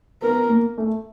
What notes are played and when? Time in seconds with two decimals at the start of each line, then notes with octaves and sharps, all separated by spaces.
0.22 B3 A#4
0.49 A#3
0.78 A3